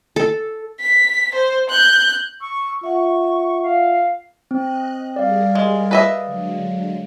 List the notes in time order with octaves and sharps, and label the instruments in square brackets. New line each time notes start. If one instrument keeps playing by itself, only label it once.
[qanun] A4
[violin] B6
C5
F#6 G6
[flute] C#6 [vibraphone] E6
[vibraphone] F4 E5 F#5 [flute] C#6
[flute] F5
[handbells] C4 [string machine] D#5 F#6
[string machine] G3 G#4 A#4 [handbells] D5 F5
[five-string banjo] G#3
B4 D#5 E5
[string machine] D3 F#3 G#3